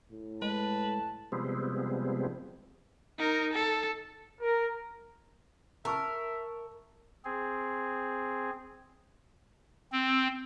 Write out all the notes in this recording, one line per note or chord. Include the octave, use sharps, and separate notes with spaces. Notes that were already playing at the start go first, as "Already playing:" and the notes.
A2
G#3 B4 A5
C3 F3 G3 G#3 B3 C4
D#4 A#4
A4
A#4
A#4 E5 A5 C#6 E6
C4 G#4
C4